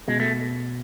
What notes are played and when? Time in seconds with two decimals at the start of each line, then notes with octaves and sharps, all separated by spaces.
0.08 B2 G#3
0.20 A3